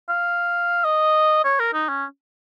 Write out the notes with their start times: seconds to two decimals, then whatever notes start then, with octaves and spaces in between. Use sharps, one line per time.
0.09 F5
0.84 D#5
1.44 C#5
1.59 A#4
1.74 D#4
1.89 C#4